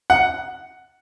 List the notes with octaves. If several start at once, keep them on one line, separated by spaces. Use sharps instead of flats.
F#5